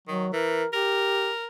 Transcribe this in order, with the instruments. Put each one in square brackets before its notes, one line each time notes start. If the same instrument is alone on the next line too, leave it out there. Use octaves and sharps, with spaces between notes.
[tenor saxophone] D#3 [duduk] F#3
[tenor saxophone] E3 [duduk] A#4
[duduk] G4 [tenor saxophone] A#4